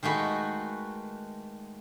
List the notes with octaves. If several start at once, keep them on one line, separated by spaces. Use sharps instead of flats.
D#3 G#3 A3 F#4 B4